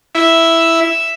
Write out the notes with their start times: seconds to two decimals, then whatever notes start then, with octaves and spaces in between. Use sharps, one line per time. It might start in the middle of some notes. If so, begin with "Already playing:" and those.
0.15 E4 E5